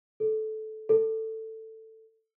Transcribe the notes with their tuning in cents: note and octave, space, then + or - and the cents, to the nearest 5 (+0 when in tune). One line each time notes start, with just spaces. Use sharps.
A4 -15
A4 +10